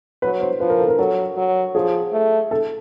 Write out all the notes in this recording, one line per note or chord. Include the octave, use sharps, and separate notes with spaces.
F#3 B4
C5
F3 B4
A#4
A4
A#4
F#3 A4
F#3
F3 G#4
A3
A4